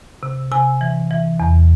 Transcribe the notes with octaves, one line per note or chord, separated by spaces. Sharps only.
C3
C3 G#5
E3
E3
E2